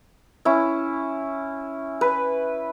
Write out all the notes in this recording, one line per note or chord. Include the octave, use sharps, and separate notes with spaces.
C#4 E4
B4